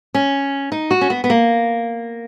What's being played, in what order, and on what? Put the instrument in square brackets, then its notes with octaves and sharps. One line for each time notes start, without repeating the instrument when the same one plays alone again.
[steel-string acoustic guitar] C#4
D#4
F#4
C#4
B3
B3
A#3